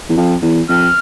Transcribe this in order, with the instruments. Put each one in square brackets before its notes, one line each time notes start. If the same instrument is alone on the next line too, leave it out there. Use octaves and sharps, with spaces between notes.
[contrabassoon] E2
F2
E2
[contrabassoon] F2 [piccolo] F6